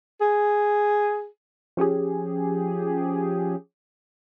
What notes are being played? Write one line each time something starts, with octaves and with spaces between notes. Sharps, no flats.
G#4
F3 C#4 G4 G#4